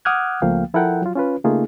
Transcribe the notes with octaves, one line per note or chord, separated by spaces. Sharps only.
F#5 D6 D#6 F6 F#6 G#6
C#2 F3 A3 A#3 F5 G5
F3 E4 A4 A#4 F#5 G5
F#3 F4
C#4 F4 B4
C#3 A3 A#3 D#4 F4 G#4